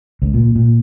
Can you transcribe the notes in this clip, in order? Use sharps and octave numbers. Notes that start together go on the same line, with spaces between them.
C#2
A#2
A#2